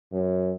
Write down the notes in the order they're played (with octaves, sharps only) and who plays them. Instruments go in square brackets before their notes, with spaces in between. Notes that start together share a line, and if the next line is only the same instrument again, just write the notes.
[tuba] F#2